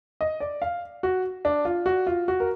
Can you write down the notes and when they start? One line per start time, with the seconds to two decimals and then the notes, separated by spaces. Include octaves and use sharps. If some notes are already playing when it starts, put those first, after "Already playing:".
0.21 D#5
0.40 D5
0.62 F5
1.03 F#4
1.45 D4
1.65 F4
1.86 F#4
2.07 F4
2.28 F#4
2.40 A#4